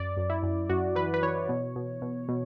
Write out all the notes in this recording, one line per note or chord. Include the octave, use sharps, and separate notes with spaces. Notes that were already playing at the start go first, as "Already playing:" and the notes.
Already playing: F#2 D5
F#2
E4
F#2
F#2 F#4
E3 B4
B4
E3 C#5
B2
B2
B2
B2